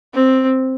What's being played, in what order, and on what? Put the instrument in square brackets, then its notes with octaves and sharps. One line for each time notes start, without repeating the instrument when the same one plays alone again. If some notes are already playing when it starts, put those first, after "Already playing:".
[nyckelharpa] C4